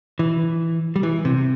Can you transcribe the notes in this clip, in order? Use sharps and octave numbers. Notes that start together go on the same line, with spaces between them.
E3
G3
E3
C3